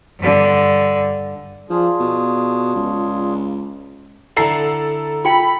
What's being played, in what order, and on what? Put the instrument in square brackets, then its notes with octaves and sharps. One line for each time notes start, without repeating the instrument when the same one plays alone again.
[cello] G2 D3
[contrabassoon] F3 [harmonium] D4 F4 G#4
[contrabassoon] B2
C#2
[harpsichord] D3 E4 [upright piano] A4 A#5 C7
[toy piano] F4 G5 [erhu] B5